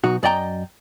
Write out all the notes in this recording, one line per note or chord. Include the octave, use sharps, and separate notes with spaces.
B1 D#4 F#4
F#2 D5 D#5 G5 A#5